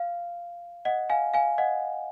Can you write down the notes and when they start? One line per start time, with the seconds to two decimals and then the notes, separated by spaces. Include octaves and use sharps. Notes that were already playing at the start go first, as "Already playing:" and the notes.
Already playing: F5
0.85 D#5 F#5
1.10 F5 G#5
1.34 F5 G#5
1.58 D#5 F#5